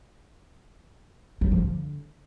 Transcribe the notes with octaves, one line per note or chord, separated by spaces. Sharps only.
F#3
F3
D3